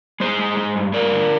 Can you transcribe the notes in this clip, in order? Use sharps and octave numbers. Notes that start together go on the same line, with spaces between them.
G#3 G#4 C5
G#3
G#3
G2
G2 A#4 D5
D3